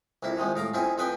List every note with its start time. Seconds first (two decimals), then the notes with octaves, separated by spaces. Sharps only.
0.23 C2 F2 A#3 E4
0.37 C3 D#3 F3 G#3
0.56 A2 A#4 F5 A#5
0.74 F2 C4 C#4 E4 G#4
0.98 F2 F3 G#4 B4 G5 G#5